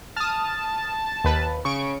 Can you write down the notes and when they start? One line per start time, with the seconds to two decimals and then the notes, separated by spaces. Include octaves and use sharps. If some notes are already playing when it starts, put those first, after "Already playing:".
0.16 A5 D#6 F6
1.24 D#2 B4
1.65 C#3 C#6 D7